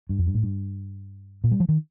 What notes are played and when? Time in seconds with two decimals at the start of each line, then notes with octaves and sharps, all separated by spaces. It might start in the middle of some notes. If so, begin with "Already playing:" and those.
0.09 G2
0.18 F2
0.27 G2
0.35 A2
0.43 G2
1.44 A#2
1.51 G3
1.60 F3
1.69 D#3